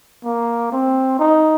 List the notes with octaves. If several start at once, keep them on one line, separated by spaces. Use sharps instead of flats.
A#3
C4
D#4